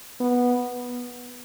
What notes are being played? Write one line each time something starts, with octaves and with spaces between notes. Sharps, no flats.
B3